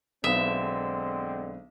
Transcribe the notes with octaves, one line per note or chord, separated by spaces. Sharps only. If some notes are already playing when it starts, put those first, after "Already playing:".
B1 D3 G#3 B3 C4 E5 D#6